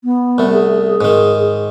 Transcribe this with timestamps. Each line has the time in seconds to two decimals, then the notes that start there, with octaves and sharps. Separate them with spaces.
0.04 B3
0.38 C2 A3
0.53 G#4
0.86 G#4
1.01 G#2 D#3